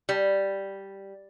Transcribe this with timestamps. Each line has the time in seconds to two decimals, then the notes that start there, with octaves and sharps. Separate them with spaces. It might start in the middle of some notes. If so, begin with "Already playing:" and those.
0.09 G3